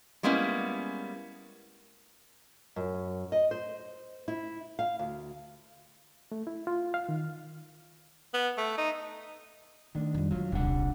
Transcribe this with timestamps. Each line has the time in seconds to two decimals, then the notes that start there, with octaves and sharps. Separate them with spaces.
0.23 G3 G#3 A#3 B3 C#4 E4
2.76 F#2
3.32 D#5
3.51 C5
4.28 E4
4.79 F5
4.99 D2
6.32 A3
6.47 E4
6.67 F4
6.94 F5
7.09 D#3
8.34 B3
8.58 A3
8.78 D#4
9.95 D#3 A3 D4
10.14 F2 G3
10.31 D3 F#3 G#3 F4
10.52 D#1 C2 C3 D4 F#5